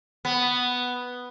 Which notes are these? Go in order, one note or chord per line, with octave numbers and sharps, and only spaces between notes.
B3